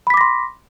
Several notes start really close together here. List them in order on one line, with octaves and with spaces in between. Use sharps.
B5 B6 D6 A#6 C6